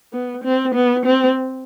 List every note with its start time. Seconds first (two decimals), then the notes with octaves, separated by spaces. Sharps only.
0.13 B3
0.44 C4
0.75 B3
1.05 C4